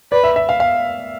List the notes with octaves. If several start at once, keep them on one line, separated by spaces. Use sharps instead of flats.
B4 D5
E5
E5
F5
F5